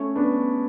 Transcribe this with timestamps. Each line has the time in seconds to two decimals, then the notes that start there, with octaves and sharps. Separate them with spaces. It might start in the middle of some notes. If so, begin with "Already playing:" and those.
Already playing: A3 C#4
0.16 B3 D4